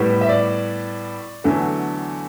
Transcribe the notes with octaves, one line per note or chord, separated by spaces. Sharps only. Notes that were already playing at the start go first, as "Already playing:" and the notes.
Already playing: A2 G3 B3
E5
D5
E2 D3 F#3 A3